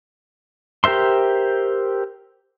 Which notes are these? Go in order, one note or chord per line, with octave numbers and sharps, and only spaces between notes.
G4 A#4 C5 E5 C6